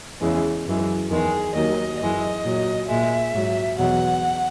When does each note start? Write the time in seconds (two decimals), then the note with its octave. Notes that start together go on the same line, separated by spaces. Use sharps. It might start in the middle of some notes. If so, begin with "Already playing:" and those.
0.21 E2 C#3 E3 G#3
0.67 F#2 E3 G#3
1.11 E2 D#3 G#3 G#4
1.55 D#2 D#3 F#3 D#5
2.00 F#2 E3 G#3 D#5
2.44 A#2 F#3
2.89 A#2 G#3 E5
3.33 G#2 F#3
3.78 E2 B2 F#3 F#5